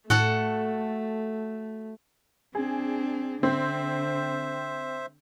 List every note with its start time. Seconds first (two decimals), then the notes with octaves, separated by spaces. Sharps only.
0.10 A2 A3 F#4 A4 F#5
2.55 C4 D4 G#4
3.43 D3 C4 C5 E5